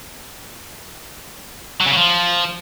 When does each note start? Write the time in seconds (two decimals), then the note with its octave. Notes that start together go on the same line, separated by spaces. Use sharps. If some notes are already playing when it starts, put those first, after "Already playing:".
1.81 F#3
1.86 C#3
1.92 F#3
1.97 F3